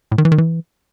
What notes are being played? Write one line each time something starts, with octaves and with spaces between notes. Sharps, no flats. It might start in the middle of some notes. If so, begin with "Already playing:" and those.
A2
D#3
E3
D#3
E3